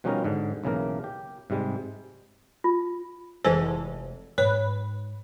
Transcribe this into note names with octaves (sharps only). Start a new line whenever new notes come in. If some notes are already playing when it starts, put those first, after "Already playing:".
B2 F3 G3 C#4 D#4 A#4
G#2 D3
B1 C#3 E3 A#3 A#4
G4
G#2 C3 G3 G#3
F4
F1 E3 G#3 D#4 A4 B4 C5 G#5
G#2 B4 C#5